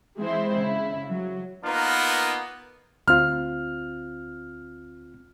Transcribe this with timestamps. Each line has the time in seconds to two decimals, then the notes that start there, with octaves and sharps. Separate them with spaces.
0.18 E3 G#3 C4 E4 C5
0.54 C#3 E4
1.10 F#3
1.65 A#3 B3 D#4 F4 A#4 B4
3.08 D2 C4 F4 F6